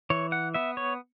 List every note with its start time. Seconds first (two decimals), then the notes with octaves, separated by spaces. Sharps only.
0.10 E3 C#5
0.32 F#5
0.54 B3 E5
0.77 C#5